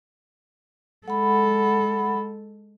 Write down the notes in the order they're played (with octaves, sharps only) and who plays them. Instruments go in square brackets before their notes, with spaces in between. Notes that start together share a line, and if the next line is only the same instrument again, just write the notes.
[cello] G#3 A4 [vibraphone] F#5 B5